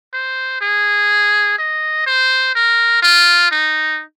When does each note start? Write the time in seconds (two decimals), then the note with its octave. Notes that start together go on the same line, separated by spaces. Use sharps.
0.14 C5
0.61 G#4
1.59 D#5
2.06 C5
2.55 A#4
3.02 F4
3.51 D#4